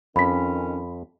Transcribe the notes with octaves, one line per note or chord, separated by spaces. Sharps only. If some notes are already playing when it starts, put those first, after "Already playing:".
F2 D#3 C#4 B5 B6